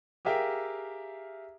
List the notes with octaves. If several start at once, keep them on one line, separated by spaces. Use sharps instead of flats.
G4 G#4 A#4 E5 F5 G5